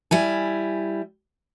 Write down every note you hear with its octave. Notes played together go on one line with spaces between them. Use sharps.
G3 E4 G#5